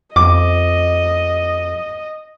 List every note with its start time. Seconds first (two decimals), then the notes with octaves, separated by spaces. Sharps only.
0.16 F2 D#5 D6